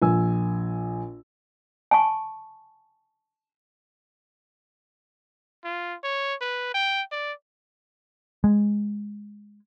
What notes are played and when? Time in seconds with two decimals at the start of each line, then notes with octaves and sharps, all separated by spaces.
0.02 A#1 G#5 E6
1.91 G#5 A5 C#6
5.64 F4
6.04 C#5
6.41 B4
6.75 G5
7.12 D5
8.44 G#3